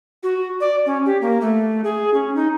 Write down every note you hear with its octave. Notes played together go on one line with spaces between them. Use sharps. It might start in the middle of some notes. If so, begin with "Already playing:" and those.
F#4
D5
C#4
G4
A#3
A3
G#4
C#4
D#4